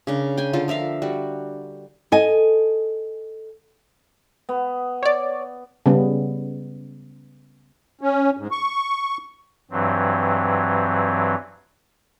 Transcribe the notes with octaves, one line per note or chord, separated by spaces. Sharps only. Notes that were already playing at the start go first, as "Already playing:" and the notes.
C#3 D4 A#4
G5 G#5
D3 F4 A4
F3 A#4 E5 F5
G3 F#4
A4 D#5 G#5
B3
C#5 D5
C#3 G3 B3 C#4
C#4
G#2
C#6
G2 E3 F#3 C4